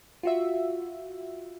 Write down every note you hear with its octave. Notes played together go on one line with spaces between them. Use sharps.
F4 F#4 E5